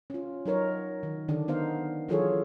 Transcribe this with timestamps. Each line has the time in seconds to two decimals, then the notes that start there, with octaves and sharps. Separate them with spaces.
0.10 C#4 F4
0.46 F#3 D#4 A#4 C#5
1.03 D#3
1.28 D3 D#3 D4
1.48 B3 D#4 C5 F5
2.08 E3 F#3 F4 G#4 A4 C#5